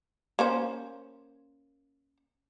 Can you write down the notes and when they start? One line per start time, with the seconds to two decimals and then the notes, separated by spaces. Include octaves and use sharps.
0.39 A#3 C#4 C5